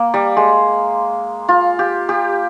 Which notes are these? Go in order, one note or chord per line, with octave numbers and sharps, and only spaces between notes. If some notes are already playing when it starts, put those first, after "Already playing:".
Already playing: A#3
G3
G#3
F4
G4
G4